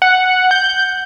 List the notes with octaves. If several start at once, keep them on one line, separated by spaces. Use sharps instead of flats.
F#5
G6